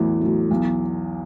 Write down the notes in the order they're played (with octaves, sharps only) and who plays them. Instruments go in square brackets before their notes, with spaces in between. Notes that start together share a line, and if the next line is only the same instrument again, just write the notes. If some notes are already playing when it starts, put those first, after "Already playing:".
Already playing: [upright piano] E2 E3 [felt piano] A2 F#3 A3
[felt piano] F#3 A3
B1